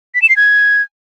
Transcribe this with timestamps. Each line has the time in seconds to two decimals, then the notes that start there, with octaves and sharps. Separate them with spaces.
0.15 B6
0.22 E7
0.29 C7
0.37 G#6